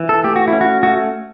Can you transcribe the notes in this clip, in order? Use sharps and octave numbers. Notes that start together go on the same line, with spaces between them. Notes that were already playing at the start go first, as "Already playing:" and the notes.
Already playing: E3
A4
A3 G4
F#4
E4
C#4
F#4
A3 F#4